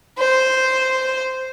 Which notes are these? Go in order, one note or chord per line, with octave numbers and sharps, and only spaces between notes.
C5